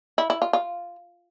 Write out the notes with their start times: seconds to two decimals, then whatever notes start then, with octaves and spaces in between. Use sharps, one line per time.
0.18 E4
0.30 E4
0.42 F4
0.53 F4